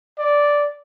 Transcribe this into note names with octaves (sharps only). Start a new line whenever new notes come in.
D5